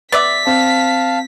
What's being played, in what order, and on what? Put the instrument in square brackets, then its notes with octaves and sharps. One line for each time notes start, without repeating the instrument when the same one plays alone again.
[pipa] B3 D5 E5 [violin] B6
[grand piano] C4 [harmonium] F5 A5